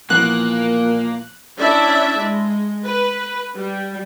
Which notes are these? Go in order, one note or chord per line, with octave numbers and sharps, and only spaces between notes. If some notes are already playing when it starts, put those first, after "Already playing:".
A#2 E3 F3 A#3 B3 F#6
C#4 D4 E4 D5 E5
G#3
B4
G3